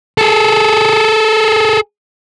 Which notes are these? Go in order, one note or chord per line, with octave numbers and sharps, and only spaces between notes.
G#4 A4